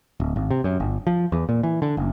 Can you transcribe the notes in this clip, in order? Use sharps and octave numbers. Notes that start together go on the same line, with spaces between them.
D1
G#1
C3
F#2
G1
F3
E2
A#2
E3
D3
F#1